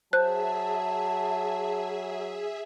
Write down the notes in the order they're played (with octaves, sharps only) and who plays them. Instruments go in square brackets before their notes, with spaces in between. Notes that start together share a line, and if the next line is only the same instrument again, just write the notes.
[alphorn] F#3 [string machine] G#4 E5 [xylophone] C5 F#6 [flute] A5